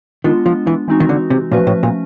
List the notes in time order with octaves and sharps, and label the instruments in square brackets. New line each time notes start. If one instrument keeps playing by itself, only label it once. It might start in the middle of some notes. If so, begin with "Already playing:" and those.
[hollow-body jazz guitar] D#3 [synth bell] G#3 B3 D4 F4
[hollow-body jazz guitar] F3
E3
[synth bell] E3 G#3 C4 D#4 F#4
[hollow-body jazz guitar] D#3
D3
C3
[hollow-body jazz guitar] A#2 [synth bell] F3 A3 C#4 F#4 B4
[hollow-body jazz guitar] A2
A#2